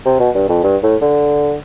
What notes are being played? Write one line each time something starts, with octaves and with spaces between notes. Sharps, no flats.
C3
B2
G2
F2
G2
A2
D3